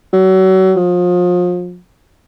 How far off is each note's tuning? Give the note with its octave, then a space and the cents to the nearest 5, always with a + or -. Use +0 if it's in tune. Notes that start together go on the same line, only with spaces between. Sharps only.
F#3 +30
F3 +35